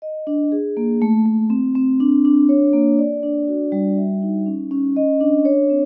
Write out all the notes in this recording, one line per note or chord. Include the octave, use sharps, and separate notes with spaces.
D#5
D4
G#4
A#3
A3
A3
C4
C4
D4
D4
C#5
A#3
D5
D4
F#4
G3
E5
D#4
C#4
C#4
D#5
D4
C#5
C4